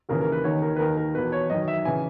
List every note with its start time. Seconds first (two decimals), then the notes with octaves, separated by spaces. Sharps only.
0.09 D#2 C#3 E3 A#4
0.21 A#4
0.32 B4
0.44 D#2 D#3 C#5
0.62 A#4
0.76 B4
0.79 D#2 D#3 A#4
0.97 A#4
1.15 E2 B2 B4
1.32 C#5
1.50 F#2 D#3 D#5
1.68 E5
1.85 C#3 E3 G#5